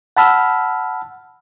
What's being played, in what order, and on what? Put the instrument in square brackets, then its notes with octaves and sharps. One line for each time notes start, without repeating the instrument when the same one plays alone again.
[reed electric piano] F#5 A5 B5 E6 F6